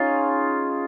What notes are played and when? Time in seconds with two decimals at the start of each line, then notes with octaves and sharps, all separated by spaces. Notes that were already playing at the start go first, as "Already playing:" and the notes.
Already playing: C#4 D#4 F4 G#4